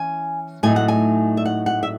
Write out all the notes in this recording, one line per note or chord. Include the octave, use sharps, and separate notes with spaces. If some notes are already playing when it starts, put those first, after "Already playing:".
Already playing: E3 C#4 G#5
A2 F#3 A3 D#4 G#5
F#5
G#5
E5
F#5
F#5
E5